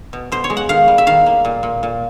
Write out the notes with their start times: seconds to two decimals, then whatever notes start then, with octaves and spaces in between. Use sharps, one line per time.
0.13 B2
0.32 B2 C5
0.44 C#5
0.50 G#3
0.57 F#5
0.69 D#3 F5
0.88 G3
0.98 E5
1.07 D#3 F5
1.26 A#3
1.45 A#2
1.63 A#2
1.83 A#2